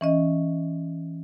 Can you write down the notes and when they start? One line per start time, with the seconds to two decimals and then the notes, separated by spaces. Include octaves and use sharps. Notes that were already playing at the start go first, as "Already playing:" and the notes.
0.01 E3 C#4 D#5